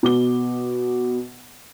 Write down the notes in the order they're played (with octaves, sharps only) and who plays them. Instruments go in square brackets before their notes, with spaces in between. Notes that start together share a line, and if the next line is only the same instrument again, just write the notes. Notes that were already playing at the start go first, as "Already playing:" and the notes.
[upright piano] B2 D6 G7